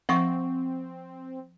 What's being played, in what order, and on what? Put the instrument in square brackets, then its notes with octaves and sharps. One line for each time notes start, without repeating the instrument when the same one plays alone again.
[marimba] F3 [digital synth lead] C4 [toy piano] E5 F#5 C#6